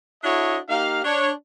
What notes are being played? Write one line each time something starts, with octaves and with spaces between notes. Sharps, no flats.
D4 E4 F#4 A4 C#5 D#5
A#3 D#4 G4 F5
D4 C#5